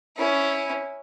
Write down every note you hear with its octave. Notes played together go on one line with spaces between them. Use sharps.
C#4 E4